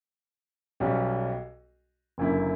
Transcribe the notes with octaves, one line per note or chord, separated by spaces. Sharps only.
B1 B2 G3 C#4 F#4
F#1 F#2 D3 A#3 E4